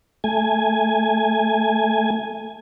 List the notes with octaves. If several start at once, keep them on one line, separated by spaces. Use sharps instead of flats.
A3 G#5